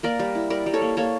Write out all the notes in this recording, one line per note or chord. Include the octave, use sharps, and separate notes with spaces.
A#3 A#4 D5
G3
E4
G3 A#4 D5
G3
A4 C#5
A#3
A#3 A4 C#5